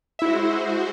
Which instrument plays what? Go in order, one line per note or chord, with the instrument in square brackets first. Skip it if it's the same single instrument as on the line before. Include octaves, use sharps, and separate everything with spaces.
[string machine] G#3 F#4 C5 [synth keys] E4 E5